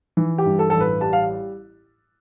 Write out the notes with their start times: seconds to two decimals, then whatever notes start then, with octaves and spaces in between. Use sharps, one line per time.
0.17 E3
0.38 G4
0.45 G2
0.59 A4
0.70 A1 A4
0.80 B4
1.01 G3 A5
1.13 F5